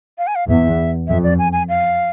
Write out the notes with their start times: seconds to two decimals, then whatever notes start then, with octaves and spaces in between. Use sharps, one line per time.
0.18 F5
0.27 G#5
0.35 F5
0.49 E2 E5
1.08 F2 E5
1.23 D5
1.39 G#5
1.52 G#5
1.69 F5